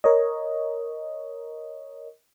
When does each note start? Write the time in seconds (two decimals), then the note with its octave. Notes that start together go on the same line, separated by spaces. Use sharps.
0.04 A#4 C#5 D#5